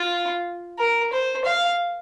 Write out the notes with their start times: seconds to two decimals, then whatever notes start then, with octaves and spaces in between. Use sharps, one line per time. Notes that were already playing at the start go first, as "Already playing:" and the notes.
Already playing: F4
0.79 A#4
1.13 C5
1.45 F5